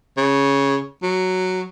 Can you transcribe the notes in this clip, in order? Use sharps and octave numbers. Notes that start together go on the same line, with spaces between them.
C#3
F#3